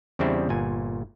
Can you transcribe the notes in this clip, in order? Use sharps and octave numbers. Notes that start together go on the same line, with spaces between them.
E2 C#3 G3 C4 D4 E4
G1 A#2 G#5